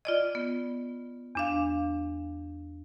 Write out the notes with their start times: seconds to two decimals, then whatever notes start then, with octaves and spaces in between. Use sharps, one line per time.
0.05 F4 D5 D#5
0.35 B3
1.35 E2 D4 F5